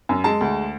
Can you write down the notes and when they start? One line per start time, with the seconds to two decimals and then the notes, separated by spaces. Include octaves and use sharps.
0.09 F#2
0.24 G#3 A5
0.41 D2